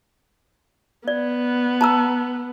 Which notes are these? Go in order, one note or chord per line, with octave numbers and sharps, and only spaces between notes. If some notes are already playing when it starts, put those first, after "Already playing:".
B3 D5
A5 A#5 E6